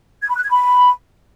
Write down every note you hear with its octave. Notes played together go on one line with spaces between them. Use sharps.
G#6
B5
F#6
G#6
B5